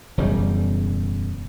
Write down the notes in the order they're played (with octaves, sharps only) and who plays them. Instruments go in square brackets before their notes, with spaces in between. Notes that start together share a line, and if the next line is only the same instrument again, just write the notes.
[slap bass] E1 F#2 C#3 G3